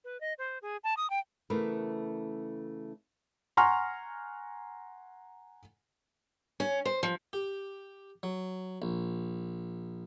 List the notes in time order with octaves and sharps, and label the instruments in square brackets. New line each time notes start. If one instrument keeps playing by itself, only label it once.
[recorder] B4
D#5
C5
G#4
A5
D#6
G5
[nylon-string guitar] C#3 E3 A3 B3 A#4 B4
[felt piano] F#5 G#5 A#5 C6 C#6 F6
[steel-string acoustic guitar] C#4
C5
F3
[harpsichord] G4
F#3
A#1